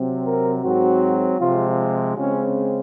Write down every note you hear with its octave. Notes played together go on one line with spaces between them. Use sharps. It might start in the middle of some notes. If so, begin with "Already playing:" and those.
Already playing: C3 F#3 C4
A#4
G#2 F#3 C4 F#4
C3 F3 G#3 F4
C#3 G#3 C4 C#4